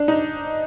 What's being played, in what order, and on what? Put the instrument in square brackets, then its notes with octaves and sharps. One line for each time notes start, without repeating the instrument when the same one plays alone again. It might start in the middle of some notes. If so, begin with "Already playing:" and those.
Already playing: [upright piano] D4
D#4